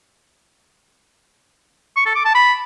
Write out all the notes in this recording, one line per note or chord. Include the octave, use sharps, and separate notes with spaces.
C#6
A4
D6
A5
B5